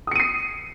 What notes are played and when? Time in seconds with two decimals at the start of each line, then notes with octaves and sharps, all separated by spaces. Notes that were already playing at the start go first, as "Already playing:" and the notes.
0.07 D#6
0.11 C#7
0.16 D#7
0.20 C7